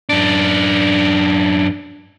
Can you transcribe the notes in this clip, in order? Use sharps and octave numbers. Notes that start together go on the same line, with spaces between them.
F#2 D4